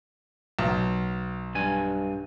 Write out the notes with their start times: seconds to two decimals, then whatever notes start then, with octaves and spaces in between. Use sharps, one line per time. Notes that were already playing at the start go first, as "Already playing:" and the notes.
0.59 B1
1.55 G2 G#5